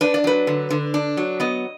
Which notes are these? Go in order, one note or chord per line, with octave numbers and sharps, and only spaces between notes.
D4 B4
D5
F#3 B4
D3
D3
D4
F#3
B3 D#5